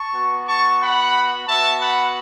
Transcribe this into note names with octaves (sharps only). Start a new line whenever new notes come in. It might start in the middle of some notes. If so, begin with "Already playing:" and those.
Already playing: A5 C#6
B3 F#4
A5 C#6
F#5 B5
B3 F#4 E5 A5
F#5 B5